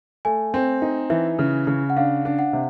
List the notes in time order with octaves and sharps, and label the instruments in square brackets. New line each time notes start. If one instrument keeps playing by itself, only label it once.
[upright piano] A3 [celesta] G#5
[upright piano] C4
D#4
[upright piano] E3 [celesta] E5
[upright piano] C#3
C#3
[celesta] F#5
[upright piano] D4 [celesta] F5
[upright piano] D4
[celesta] F#5
[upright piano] C3